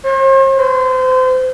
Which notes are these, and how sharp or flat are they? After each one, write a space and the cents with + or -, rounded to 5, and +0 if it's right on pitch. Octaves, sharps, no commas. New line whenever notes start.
C5 +45
C5 -30